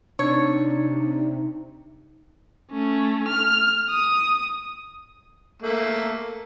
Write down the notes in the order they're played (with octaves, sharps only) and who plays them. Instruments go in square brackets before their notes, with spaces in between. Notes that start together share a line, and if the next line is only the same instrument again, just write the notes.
[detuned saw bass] C3 [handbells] D4 D5 C#7 [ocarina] D#4 [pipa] C#5
[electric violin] A3 C#4
F6
D#6
[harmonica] A3 A#3